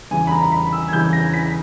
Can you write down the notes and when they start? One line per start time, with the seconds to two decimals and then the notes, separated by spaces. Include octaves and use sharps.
0.11 E2 C#3 E3 G#5
0.27 B5
0.31 A#5
0.42 A#5
0.52 B5
0.73 E6
0.88 G#6
0.93 E2 C#3 E3 G6
1.13 A#6
1.34 B6